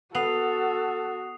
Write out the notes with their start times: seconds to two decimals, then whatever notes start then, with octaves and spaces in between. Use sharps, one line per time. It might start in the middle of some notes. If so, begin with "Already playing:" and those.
0.15 B3 F#4 A4 D#6 C7 F7